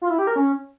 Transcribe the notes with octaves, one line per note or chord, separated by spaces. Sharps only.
F4
E4
G4
A#4
C#4